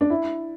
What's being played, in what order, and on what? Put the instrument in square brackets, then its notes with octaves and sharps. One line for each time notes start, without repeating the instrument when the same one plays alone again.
[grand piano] D4
E4